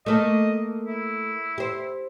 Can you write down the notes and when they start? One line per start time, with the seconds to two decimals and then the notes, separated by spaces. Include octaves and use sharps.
0.06 A3 A#3 A4 D#5
0.87 E4
1.58 G4 C5